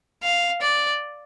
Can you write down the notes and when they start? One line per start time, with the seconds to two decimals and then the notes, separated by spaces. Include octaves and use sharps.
0.23 F5
0.61 D5